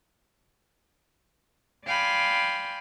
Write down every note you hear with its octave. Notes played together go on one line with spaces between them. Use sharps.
D5 F5 G5 G#5 B5 C6